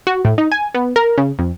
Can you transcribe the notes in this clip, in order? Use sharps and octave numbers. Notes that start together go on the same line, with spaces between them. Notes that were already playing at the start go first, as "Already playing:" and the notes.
F#4
A2
D#4
G#5
B3
A#4
C#3
F2